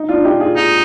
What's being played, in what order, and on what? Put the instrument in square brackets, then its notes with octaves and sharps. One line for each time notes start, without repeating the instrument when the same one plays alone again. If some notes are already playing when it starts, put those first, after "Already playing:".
Already playing: [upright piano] D#4
D4 F4
D#4 G4
F4 G#4
[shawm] D#4 [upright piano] F4 G#4